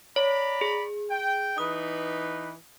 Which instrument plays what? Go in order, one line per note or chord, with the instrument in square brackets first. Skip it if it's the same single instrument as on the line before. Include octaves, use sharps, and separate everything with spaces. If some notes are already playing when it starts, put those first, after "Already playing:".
[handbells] C#5 [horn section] D5 A#5 B5
[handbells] G#4
[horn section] G5
[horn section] E3 D#4 B4 [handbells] D#6